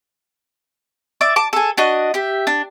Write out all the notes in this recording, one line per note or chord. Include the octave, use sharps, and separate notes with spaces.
D5 E5 D6
A5 D6
G#4 A4
D4 F#4 D#5
G4 E5
D4